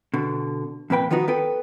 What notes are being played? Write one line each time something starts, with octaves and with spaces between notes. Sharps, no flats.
B2 D3
F2 A#2 B4 G5
D#3 F3 B3 D#4 F#4
B3 A4 B4 G5